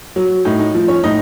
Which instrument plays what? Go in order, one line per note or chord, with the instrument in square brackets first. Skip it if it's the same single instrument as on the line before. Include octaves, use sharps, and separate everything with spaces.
[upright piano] F#3
A2 D#4
D#4
F3
C#4 C#5
A2 D#4 D#5